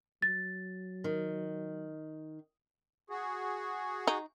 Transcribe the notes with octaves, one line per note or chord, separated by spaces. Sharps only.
F#3 A6
D#3
F#4 G#4
D#4